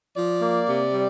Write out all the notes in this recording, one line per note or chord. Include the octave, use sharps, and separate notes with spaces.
F3 D5
A#3
C3
G3